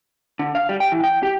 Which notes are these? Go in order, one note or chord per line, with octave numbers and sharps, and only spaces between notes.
D3
F5
G3
G5
E3
G5
G4